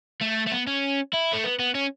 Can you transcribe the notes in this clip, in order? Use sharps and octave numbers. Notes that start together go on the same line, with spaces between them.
A3
A3
B3
C#4
E4
A3
B3
B3
C#4